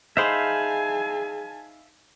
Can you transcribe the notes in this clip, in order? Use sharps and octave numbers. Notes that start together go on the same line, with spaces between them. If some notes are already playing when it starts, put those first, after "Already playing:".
D#4 G#4 C5 E5 F5 G#5 A5 B5